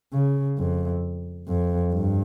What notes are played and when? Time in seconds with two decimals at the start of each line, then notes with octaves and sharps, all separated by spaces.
0.13 C#3
0.58 F2
1.48 F2
1.93 G2